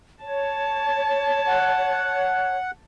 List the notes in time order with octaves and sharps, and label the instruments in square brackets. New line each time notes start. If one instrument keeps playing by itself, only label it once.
[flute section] C#5 [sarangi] A5
[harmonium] F#5